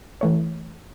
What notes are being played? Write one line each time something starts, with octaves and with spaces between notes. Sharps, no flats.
E3 A3 C#5